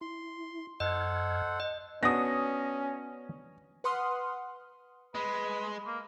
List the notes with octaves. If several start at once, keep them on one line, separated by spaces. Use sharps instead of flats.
E4 C6
F#2 A4 C5 D#5 F#5 F6 G#6
D#5
B3 C#4 D4 F#4 D#6 A#6
B4 F#5 C6 D#6 F6
G#3 B4
A#3